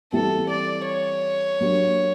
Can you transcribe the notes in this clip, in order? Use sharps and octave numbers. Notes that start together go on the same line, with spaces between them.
E3 G3 C4 E4 G4 A4
D5
C#5
F#3 A#3 D4 G4